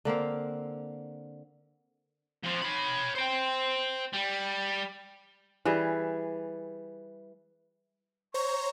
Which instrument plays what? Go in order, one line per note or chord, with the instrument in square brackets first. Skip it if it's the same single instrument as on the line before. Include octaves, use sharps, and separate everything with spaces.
[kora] D3 A#3 C4 F5
[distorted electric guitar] F2 F3
C#5 B5
C5 G5
G3
[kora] E3 G3 G#4
[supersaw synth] C5 C#5 A#5 [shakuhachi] C#6